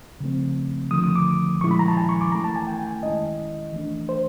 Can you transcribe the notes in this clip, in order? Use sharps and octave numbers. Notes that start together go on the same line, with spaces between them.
C#3 F3 A3 C4
D3 F3 A3 D#6
D#6
D6
A#2 F3 G#3 C#4 E4 C#6
B5
A#5
A5
G#5
C#6
D6
E3 A3 C#4 E4 A#5
A5
G#5
G5
G5
G#5
D#3 G#3 C#4 E4 D#5
E3 A3 D4
C5